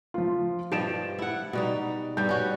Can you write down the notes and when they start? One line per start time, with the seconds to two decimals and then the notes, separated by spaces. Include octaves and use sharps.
0.14 F3 F4
0.72 G2 F3 G4 D#5 D7 E7
1.19 E4 F#5
1.53 B2 G3 D#4
2.17 G2 G3 G6
2.29 C#4 F#4